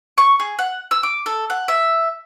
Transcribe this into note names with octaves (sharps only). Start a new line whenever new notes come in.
C#6
G#4
F#5
E6
D6
A4
F#5
E5